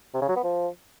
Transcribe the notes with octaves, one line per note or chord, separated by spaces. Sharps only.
C3
C#3
F#3
B3
F3